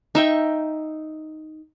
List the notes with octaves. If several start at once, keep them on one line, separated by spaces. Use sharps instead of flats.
D#4 E5 G5 C#6